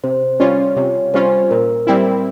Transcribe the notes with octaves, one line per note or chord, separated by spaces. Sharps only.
C3 C5
G3 C#4 F4 C#5
C3 C#5
G3 C#4 F4 C5
A#2 A#4
G3 C4 E4